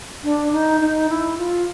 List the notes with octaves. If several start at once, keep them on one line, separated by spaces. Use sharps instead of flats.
D4
D#4
D#4
E4
F4